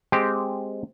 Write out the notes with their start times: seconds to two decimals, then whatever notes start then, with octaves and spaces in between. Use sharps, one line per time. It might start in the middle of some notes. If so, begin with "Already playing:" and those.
0.12 G#3 C4 G4